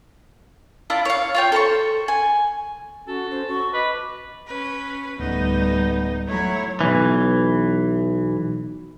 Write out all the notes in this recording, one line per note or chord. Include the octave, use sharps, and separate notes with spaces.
E4 F4 D5 A5
C#5 F5
F4 C#5 G5
A4 C5 A#5 C#6
G#5
C#4 F#4 A4
C#4 C5
F#4 C#6
B4 D#5 D6
C#4 B4
D1 D2 G3 A3 B3 D#4
F#3 A3 E4 C#5
B1 E3